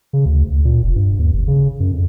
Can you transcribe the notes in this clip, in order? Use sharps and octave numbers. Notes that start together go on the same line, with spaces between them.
C#3
D2
D2
A#2
F1
G2
D#2
G1
C#3
F#2
F2